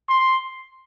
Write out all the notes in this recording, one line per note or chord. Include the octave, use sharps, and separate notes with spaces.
C6